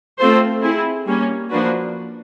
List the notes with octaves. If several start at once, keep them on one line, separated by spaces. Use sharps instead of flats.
A3 C4 F4 A4 C5
C4 E4 G#4
G3 A#3 C#4
F3 A#3 D4 F#4 B4